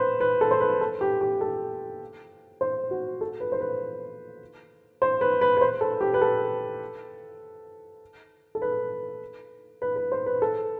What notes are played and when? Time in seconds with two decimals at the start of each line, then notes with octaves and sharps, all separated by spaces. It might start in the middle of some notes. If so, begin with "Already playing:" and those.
Already playing: B4 C5
0.20 B4
0.41 A4
0.51 C5
0.60 B4
0.81 A4
1.01 G4
1.21 G4
1.41 A4
2.61 C5
2.91 F#4
3.21 A4
3.40 B4
3.52 C5
3.61 B4
5.02 C5
5.21 B4
5.41 B4
5.57 B4
5.61 C5
5.81 A4
6.01 G4
6.14 B4
6.21 A4
8.55 A4
8.62 B4
9.82 B4
9.96 B4
10.12 C5
10.26 B4
10.42 A4